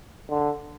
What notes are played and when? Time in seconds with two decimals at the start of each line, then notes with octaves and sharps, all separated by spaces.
0.30 D3